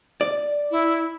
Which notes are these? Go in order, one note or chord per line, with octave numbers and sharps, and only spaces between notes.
D5
E4